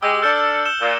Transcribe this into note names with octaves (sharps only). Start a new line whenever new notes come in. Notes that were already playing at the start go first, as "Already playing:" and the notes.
G#3 G4 E6
D4 A4 F6 G6 C#7
E6 E7 G7
A#2